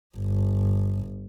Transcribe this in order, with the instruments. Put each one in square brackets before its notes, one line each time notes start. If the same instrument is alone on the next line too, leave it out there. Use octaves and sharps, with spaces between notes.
[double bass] G1